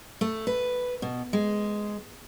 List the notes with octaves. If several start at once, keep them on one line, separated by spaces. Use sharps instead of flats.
A3
B4
B2
G#3